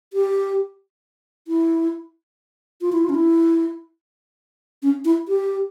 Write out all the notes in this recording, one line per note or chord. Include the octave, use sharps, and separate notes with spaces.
G4
E4
F4
E4
F4
C#4
E4
C#4
E4
G4